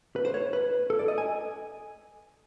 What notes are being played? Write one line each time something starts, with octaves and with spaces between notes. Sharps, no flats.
B4
C5
C#5
B4
A4
D5
D#5
G#5